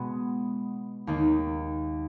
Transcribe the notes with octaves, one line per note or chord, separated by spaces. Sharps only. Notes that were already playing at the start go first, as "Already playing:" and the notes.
Already playing: B2 G#3 B3 D#6
D#2 D#3 A#3 D#4